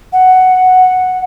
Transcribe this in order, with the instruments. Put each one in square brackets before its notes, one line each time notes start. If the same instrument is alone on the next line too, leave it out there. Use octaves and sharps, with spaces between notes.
[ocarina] F#5